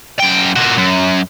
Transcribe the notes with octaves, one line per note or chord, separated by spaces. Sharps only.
F#2 G5
A#2 F#4
F#2